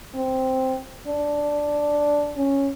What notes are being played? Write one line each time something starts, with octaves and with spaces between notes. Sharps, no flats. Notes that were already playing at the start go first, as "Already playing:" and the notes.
C4
D4
C#4